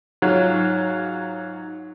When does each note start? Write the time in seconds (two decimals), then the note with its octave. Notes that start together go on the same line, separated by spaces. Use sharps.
0.22 G#2 F#3 F4